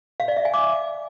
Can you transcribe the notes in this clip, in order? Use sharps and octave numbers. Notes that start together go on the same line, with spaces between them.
F5
D5
E5
G#5
D6